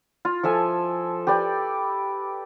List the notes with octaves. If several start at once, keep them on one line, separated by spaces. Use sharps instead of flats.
F4
F3 A4 E5 G#5
G4 B4 D5 G5